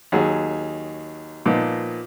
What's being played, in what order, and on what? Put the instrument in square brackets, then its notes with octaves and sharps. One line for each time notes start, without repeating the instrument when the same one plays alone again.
[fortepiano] D#2 F#3 G#4
A#2 F3 B3 D#4